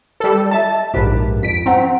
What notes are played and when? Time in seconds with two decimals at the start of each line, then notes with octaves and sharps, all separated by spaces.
0.20 G3 A4
0.51 D#5 E5 A5
0.94 A#1 G#2 G4 A#4 B4
1.42 F2 B6 D7
1.66 C4 C#4 F#5 A#5